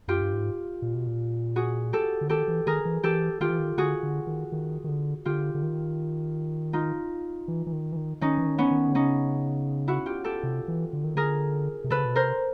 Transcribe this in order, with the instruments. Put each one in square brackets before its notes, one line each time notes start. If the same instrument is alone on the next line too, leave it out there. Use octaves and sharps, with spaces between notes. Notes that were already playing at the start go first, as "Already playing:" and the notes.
[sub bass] F#2 [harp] F4 G4
[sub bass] G2
G#2
A#2
B2
A#2
[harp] F#4 G#4
G4 A4
[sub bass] D3
[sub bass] D#3 [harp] G4 A4
[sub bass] E3
[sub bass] D#3 [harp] G#4 A#4
[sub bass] E3
[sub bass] E3 [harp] G4 A4
[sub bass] D#3 [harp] F4 G4
[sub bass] E3
D#3
[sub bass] D3 [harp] F#4 G#4
[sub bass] D3
D#3
D#3
D#3
D3
[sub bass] D3 [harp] F4 G4
[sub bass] D3
D#3
[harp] D#4 F4
[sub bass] E3
E3
D#3
E3
D#3
[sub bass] D#3 [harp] C#4 D#4
[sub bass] E3
D#3
[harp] B3 C#4
[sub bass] D#3
D3
[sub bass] C#3 [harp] C#4 D#4
[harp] E4 F#4
F4 G4
G4 A4
[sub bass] C3
E3
D3
D#3
[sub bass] D3 [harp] G#4 A#4
[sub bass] C3
[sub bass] C#3 [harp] A4 B4
[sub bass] B2
[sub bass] C3 [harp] A#4 C5